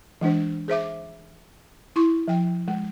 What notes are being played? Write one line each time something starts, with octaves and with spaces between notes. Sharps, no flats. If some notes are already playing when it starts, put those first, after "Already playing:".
E3 G#3 D4 C5
G#4 C5 E5 D6
E4 C6 C#6
F3 G5
G#3